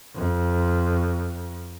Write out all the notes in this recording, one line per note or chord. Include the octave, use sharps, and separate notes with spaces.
F2